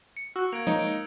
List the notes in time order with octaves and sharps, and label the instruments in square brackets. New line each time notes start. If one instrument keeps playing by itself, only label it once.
[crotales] C#7
[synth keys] F#4 [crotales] E6 F#6
[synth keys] A#3 [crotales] G#6 D7 F7
[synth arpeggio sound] F3 G#3 C#5 [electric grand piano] D#4
[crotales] D7